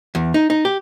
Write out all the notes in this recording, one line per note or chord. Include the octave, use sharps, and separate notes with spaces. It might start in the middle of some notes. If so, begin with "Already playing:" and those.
E2
D#4
D#4
G4